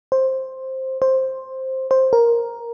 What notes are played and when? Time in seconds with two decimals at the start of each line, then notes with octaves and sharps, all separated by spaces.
0.12 C5
1.02 C5
1.91 C5
2.13 A#4